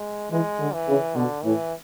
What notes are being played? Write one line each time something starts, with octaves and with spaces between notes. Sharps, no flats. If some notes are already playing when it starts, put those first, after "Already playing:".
Already playing: G#3
E3 G#3
D3
E3
C#3
B2 D3
A2 E3